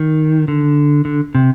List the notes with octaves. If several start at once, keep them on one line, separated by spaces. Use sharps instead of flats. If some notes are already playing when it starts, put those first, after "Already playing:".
Already playing: D#3
D3
D3
C3